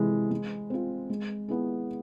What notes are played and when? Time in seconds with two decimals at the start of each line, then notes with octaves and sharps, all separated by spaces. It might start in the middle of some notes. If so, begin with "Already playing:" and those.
Already playing: C3 E3 G#3
0.31 G#3
0.70 C4 F4
1.10 G#3
1.48 B3 E4 G#4